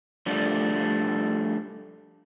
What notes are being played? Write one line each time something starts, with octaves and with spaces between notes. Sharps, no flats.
F3 G3 A3 D4